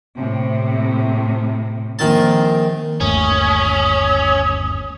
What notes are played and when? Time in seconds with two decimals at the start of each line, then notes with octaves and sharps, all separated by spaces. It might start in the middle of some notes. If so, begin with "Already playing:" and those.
0.16 A2 C3
1.99 A#1 D#3 C4 A5
3.00 G1 D#2 A3 C#4 D#6